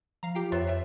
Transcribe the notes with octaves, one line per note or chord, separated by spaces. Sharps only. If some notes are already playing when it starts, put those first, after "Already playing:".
F3 F5 A#5
F4 G4 G5 C7
F2 B3 C5 C#5 E5 A6
G3 E5